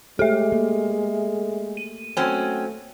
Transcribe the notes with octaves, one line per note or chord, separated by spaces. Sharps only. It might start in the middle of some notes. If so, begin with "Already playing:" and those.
G#3 A3 G4 A4 E5
A#3
D#7
F#3 A3 C4 C#4